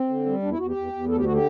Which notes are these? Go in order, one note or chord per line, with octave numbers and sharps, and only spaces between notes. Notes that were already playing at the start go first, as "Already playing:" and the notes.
Already playing: C4
D3
G3
E2 D4
E4
E2 F#4
G4
E2
E2
D2 A4
G4
D3 F#4
G4